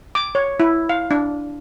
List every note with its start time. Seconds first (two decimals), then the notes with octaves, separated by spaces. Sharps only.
0.15 D6
0.35 C#5
0.60 E4
0.89 F5
1.11 D4